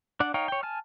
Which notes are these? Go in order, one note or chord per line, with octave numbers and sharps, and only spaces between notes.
D4 D5 F#5
D#4 C#5 F5 G5
C#5 G5
G#5 A5 F6